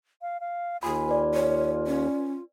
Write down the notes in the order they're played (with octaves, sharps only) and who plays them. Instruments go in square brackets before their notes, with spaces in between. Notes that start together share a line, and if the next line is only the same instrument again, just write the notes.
[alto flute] F5
F5
[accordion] D#2 [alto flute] F4 [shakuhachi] G#5 [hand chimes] B5
[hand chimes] B4 D5
[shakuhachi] C#5
C#4